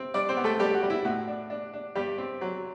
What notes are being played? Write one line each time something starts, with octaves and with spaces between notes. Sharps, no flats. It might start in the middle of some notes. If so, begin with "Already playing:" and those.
Already playing: C4
G3 D4 D5
C4 C5
B3
A3 A4
G3 G4
F#4
G3
E4
A2 F#4
D4
D4
D4
G2 G3 G4
C4
F#3